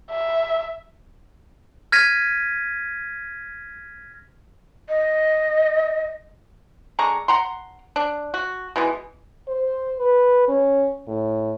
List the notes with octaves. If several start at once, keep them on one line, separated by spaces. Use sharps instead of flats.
E5
F6 G#6 A#6 B6 D#7
D#5
D3 G#3 A#5 C#6
F#5 A#5 C6
D4
F#4
B2 E3 G#3
C5
B4
C#4
A2